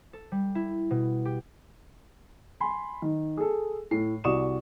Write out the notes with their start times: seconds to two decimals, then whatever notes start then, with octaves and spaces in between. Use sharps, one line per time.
0.13 A4
0.32 G3
0.55 E4
0.91 B2
1.25 G4
2.60 G#5 B5 C6
3.02 D#3
3.37 G#4 A4
3.91 A2 C7
4.24 C2 F#4 D5 C#6 D#6 E7